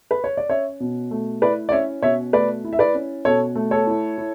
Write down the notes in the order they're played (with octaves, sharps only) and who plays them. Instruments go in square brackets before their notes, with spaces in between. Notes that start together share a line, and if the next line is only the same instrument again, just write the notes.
[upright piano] B4
C#5
D5
C#4 C#5 E5
B2
A3
E4 B4 D5
D5
C#4 C#5 E5
B2 C#5 E5
A3 B4 D5
E4
E5
B4 D5
C#4
B2 A4 C#5
A3
A4 C#5
E4
E4